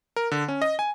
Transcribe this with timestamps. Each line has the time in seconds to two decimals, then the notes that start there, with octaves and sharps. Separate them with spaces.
0.16 A#4
0.31 D3
0.48 C#4
0.62 D#5
0.79 G#5